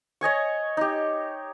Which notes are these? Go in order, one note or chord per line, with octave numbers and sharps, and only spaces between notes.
C#5 D#5 G#5 C#6
D#4 G4